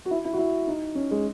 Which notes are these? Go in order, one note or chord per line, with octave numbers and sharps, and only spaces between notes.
F#4
E4
E4
F#4
E4
D#4
C#4
G#3